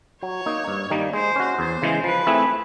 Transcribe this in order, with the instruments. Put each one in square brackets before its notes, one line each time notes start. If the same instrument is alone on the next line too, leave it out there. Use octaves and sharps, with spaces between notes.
[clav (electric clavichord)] F#3 [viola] C#5
[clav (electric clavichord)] A#3 D#4
G2
D#3 G3 A#3 D#4
[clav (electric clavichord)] G#3 [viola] C5
[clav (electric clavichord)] C#4 F#4
[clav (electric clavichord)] E2 [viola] C5
[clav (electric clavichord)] C#3 E3 G#3
[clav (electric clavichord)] F3 [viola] B4
[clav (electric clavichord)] A3 C4 E4 G#4